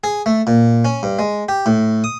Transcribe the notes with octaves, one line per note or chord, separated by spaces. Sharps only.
G#4
A3
A#2
C#4
G2
G#3
G4
A2
D#6